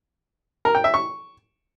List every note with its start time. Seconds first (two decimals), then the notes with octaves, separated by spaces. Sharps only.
0.65 A#4
0.75 G5
0.84 E5
0.94 C#6